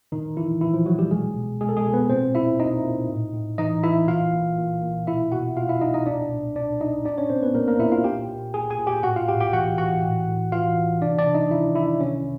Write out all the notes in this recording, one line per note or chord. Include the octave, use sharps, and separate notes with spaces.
A#2 D#3 D#4
A#2 E3 E4
A#2 E3 E4
F3 F4
A#2 F#3 F#4
G3 G4
B2 G#3 G#4
B2
B2 G#3 G#4
A4
G#3 G#4
B2
B3 B4
A#2 C4 C5
A#2 E4 E5
A#2 D#4 D#5
A#2
A2
A2
E3 D#4 D#5
E3 E4 E5
A#2 F4 F5
A#2
A#2
A#2
B2 E4 E5
B2 F#4 F#5
B2 F4 F5
E4 E5
B2 D#4 D#5
D#4 D#5
A#2 D4 D5
A#2
A#2 D4 D5
A#2 D#4 D#5
A#2 D4 D5
C#4 C#5
A#2 C4 C5
B3 B4
A#2 A#3 A#4
A#3 A#4
A#2 E4 E5
F4 F5
A#2 G4 G5
A#2
A#2 G#4 G#5
G#4 G#5
A#2
G4 G5
A2 F#4 F#5
F4 F5
A2 G4 G5
G4 G5
E3 F#4 F#5
E3 F#4 F#5
A2
A2
E3 F4 F5
E3
C3 D4 D5
D4 D5
C3
D#4 D#5
D#3 E4 E5
D#3 E4 E5
C3 C#4 C#5